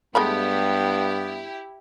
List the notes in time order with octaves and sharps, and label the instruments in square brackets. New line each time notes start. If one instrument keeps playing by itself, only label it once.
[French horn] G2 [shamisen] G#3 A3 B5 [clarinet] B3 [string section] E4 G4